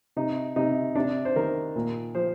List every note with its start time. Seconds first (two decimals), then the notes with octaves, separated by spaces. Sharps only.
0.16 C3 D#4
0.56 C3 D#4
0.95 C3 D4
1.25 C5
1.36 D#3 A#4
1.76 A#2
2.15 F3 C5